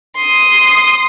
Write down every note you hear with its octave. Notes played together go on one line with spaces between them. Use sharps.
C6 D#6